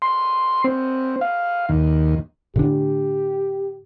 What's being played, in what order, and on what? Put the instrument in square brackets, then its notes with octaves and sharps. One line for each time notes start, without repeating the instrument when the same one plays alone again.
[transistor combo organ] C6
C4
F5
D#2
[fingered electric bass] A2 D3 D4 [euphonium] G4